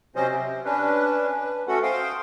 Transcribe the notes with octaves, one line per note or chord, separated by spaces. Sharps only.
C3 F#3 C4 C#4 C5 D#5
C3
C#4 D4 B4
B4
A3 C#4 F#4 A4 F#5
C5 F5 G5 C6 D#6